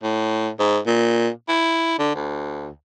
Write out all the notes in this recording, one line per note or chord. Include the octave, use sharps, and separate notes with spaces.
A2
G#2
A#2
E4
D3
D2